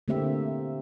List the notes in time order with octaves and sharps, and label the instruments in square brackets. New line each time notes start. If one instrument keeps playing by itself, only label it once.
[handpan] D3 A3 A#3 C4 G4 E5